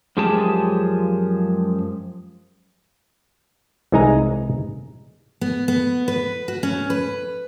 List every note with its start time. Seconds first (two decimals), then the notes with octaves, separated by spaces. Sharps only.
0.17 F#2 F3 G#3 G4 G#4 A5
3.92 C2 E3 G#3 D#4 G#5 A#5
5.41 B3
5.68 B3
6.08 B4
6.48 F#4
6.63 C#4
6.90 B4